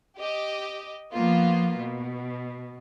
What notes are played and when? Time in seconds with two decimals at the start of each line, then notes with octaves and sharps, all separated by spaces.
0.18 G4 D#5
1.12 F3 A#3 B3 F4
1.79 B2